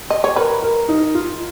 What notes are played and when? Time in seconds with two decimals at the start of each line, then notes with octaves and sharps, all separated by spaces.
0.10 D#5
0.24 C#5
0.36 A#4 B4
0.62 A#4
0.88 D#4
1.15 F4